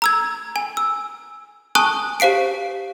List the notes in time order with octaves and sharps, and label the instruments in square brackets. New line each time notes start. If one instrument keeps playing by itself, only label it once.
[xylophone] A#5 E6 G#6
G#5
E6
G#5 A5 C#6 D#6 F#6
G4 C5 F5 C7 D7